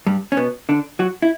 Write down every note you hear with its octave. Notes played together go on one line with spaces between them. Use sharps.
G2 G3
C#4
B2 B3
D3 D4
F#3 F#4
E4